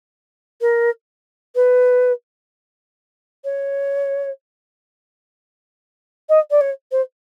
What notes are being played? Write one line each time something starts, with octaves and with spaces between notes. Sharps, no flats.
A#4
B4
C#5
D#5
D5
C#5
C5